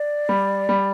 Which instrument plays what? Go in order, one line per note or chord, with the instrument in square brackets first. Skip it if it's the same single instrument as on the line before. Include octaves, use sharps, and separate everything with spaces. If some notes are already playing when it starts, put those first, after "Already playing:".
Already playing: [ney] D5
[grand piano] G3
G3